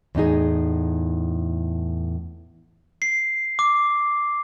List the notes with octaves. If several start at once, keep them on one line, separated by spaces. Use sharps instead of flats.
E2 A2 D#4 G#4
C7
D6